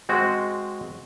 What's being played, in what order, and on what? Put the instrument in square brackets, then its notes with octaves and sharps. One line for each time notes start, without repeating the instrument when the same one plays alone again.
[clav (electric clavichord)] G#3 C4 F#4